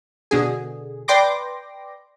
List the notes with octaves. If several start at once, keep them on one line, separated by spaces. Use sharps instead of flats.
B2 D3 G#4
B4 D5 G5 C6 D6 A#6